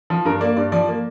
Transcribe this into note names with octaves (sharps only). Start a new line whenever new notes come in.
F3
G2 A#4
A#3 D5
G2 D5
F3 D5
A#3